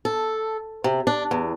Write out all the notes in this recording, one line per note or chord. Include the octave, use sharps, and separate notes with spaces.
A4
C3
D4
E2